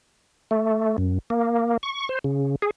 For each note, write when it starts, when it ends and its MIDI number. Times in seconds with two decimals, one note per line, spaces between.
0.51 0.96 57
0.98 1.18 42
1.30 1.77 58
1.83 2.09 85
2.09 2.19 72
2.24 2.56 49
2.62 2.71 68